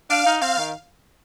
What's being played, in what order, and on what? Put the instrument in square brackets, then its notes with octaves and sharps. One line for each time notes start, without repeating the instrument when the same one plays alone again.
[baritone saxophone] D4 [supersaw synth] F5
[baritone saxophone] D#4
[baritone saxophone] C4 [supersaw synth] F5
[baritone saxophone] D#3